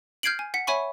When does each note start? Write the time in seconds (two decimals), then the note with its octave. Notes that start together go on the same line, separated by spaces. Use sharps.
0.23 F6 G6 G#6 C7 D7 F#7
0.39 G#5
0.54 F#5 B6
0.67 C#5 E5 G#5 B5 C#6